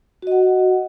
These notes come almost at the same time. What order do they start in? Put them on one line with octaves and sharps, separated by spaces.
F#4 D#5 F#5